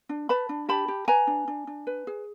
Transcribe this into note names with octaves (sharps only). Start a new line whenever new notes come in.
D4
B4 A5 B5
D4
G4 A5 B5
G4
B4 G#5 A#5
D4
D4
D4
B4
G#4